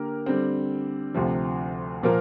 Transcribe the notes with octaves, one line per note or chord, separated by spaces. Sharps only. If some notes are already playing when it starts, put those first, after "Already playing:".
Already playing: D3 A#3 G4 A#4
D3 G3 C4
D2 C3 F3
A#2 F3 A#3 F4 A#4